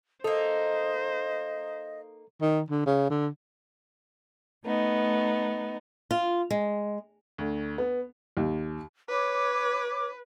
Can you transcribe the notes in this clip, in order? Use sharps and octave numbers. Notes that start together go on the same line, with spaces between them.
A#3 D#4 A4 C5 D#5
D#3
D3
C#3
D3
A3 B3 D#4
F4
G#3
D2
B3
D#2
B4 C#5 D6